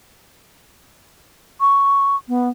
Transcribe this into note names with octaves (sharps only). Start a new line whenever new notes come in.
C#6
B3